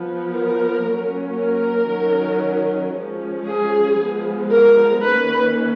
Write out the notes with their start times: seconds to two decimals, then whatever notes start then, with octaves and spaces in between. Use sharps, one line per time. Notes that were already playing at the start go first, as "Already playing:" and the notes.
Already playing: F3 B3
0.31 A#4
0.83 F#3 A#3 C#4
1.36 A#4
1.89 D#3 F#3 C#4
2.94 F3 G#3 C#4
3.47 G#4
3.99 F3 G#3 B3
4.52 A#4
5.04 D#3 A#3 C#4 B4